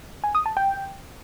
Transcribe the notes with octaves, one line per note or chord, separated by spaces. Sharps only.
G#5
D#6
A5
G5